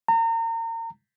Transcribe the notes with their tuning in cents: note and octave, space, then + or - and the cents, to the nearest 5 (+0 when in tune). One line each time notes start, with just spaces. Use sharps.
A#5 -35